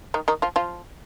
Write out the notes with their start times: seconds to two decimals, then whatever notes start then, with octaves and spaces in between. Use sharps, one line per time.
0.14 D#3 D#4
0.28 D#3 D#4
0.42 F3 F4
0.56 F3 F4